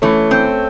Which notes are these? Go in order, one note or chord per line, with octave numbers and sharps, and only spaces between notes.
E3 A3 C#4
C4